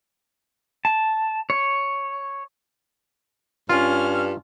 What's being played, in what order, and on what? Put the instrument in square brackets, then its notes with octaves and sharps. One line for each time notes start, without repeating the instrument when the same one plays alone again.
[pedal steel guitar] A5
C#5
[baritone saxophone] G2 [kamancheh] C#4 F6 [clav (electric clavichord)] F4